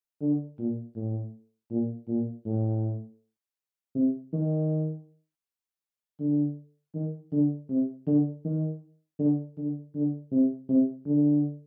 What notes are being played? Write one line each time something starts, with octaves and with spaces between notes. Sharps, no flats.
D3
A#2
A2
A#2
A#2
A2
C3
D#3
D3
D#3
D3
C3
D3
D#3
D3
D3
D3
C3
C3
D3